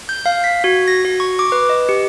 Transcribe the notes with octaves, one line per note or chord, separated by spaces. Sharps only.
G6
F5
B6
F#4
A#6
F#4
C#6
D6
B4
D#5
G4